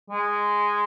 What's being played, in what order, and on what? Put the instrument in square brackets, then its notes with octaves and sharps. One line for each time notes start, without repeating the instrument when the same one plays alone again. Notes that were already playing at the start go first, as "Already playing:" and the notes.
[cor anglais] G#3